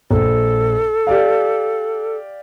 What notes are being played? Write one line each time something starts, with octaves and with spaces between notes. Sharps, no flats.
A#1 A4
G4 D5 F5